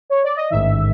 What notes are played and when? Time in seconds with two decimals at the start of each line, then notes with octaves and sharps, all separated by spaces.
0.10 C#5
0.24 D5
0.36 D#5
0.50 A1 G#2 D#3 E5